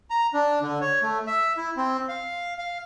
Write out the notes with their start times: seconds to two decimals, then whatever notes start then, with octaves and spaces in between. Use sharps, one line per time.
0.10 A#5
0.34 D4
0.62 D3
0.81 C#5
1.02 A3
1.27 E5
1.57 E4
1.77 C4
2.09 F5
2.58 F5